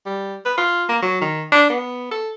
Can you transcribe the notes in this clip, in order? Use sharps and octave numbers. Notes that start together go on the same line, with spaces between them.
G3
B4
F4
A#3
F#3
D#3
D4
B3
A4